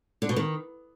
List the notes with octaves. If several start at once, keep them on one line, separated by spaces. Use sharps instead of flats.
D3
B2
D#3